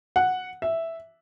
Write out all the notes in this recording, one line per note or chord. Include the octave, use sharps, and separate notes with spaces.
F#5
E5